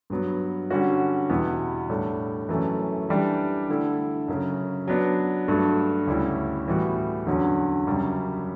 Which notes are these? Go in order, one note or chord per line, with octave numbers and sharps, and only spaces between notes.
G2 F#3 B3
D3 G3 C#4 F#4
E2 B2 G3 B3 E4
A2 G3 D4 A4 C#5
F#2 E3 A3 C#4
E3 G3 D4 G4
D3 A3 E4 A4
F#2 C#3 F#3
F#3 B3 D4
G2 F#3 A3 D4 F#4
D2 C#3 G3 C#4 E4
A2 E3 G3 B3 F#4
E2 D3 F#3 C#4
F#2 C#3 G3